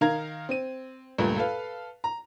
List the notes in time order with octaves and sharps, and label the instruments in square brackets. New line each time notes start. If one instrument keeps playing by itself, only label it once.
[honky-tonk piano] D#3 A#4 F5 A#5 G#6
C4 D#7
C#2 G2 A#2 A3 A#3
A4 B4 F5
A#5